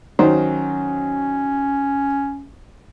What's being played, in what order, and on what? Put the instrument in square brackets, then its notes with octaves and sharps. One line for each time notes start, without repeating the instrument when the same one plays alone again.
[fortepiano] D#3 F#3 C5 [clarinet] C#4